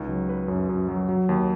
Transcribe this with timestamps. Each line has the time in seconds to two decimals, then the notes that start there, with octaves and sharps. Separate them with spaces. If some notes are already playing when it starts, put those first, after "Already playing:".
Already playing: C#2 D#4
0.09 F#3
0.29 B4
0.48 F#2
0.69 F#2
0.89 F#3
1.09 F#3
1.29 D#2